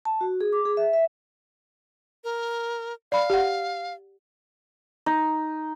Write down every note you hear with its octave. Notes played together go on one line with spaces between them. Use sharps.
A5
F#4
G#4
D6
G#4
E5
E5
A#4
D5 F5 B5
G4 F#5
D#4